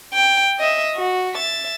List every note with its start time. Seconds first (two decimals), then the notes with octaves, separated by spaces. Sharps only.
0.14 G5
0.59 D#5 E5
0.95 F#4
1.34 E5 A6